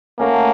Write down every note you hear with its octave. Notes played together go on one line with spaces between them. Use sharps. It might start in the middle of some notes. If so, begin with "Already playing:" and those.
A3 A#3 C#4 F#4 A#4